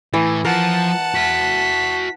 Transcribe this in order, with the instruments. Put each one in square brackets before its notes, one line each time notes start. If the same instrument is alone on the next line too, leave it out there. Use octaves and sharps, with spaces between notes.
[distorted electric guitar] A2 [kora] E3
[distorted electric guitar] F3 [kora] A#4 [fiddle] F#5 A5
[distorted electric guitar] F#4 E5 [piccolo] B6